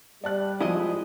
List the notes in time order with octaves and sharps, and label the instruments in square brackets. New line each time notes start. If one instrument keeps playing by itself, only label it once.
[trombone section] G3 [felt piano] D5 A5 F#6
[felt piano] F3 F#3 G#3 [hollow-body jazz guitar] E4 G#4 D#5